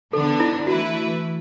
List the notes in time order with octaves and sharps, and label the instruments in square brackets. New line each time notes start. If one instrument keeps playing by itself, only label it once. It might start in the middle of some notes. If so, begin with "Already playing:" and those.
[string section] D3 B3 D4 [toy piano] A4
[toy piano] E4
[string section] E3 A3 E4 B4 [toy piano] F#4